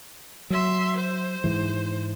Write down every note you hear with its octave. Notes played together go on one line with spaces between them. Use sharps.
F#3 E5 C6
C5
G#2 E3